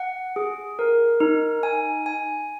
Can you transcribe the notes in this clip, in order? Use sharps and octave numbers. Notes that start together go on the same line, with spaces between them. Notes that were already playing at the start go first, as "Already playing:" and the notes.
Already playing: F#5
G#4
A#4
D#4
G#5
G#5